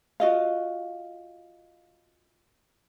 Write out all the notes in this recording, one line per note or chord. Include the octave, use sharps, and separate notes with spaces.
F4 F#4 D#5 F5